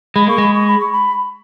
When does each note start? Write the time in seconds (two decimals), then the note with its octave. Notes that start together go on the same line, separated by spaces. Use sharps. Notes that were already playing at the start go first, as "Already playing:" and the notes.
0.15 G#3 B5
0.27 A#3 C#6
0.38 G#3 B5
0.54 C#6
0.68 B5
0.81 C#6
0.93 B5